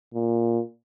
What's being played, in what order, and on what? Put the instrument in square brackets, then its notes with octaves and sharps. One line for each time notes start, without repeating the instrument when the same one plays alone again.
[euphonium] A#2